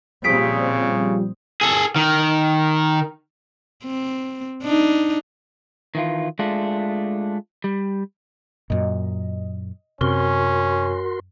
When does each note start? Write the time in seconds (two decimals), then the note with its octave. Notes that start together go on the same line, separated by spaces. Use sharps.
0.24 A#2 C#3 F3 G3 C4 D#6 B6 D7
1.61 G#4 A4
1.96 D#3
3.84 C4
4.63 D4 D#4
5.95 D#3 E3 F4
6.39 G#3 A3 D4 F4
7.64 G3
8.70 F#2 A#2 D#5
10.01 F#2 C3 C#4 F#4 A#4 C6